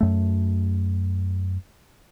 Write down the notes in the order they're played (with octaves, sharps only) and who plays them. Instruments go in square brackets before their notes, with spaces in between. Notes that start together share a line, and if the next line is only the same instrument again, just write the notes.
[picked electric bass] F#2 A3